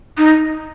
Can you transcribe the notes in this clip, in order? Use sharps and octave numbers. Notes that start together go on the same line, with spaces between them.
D#4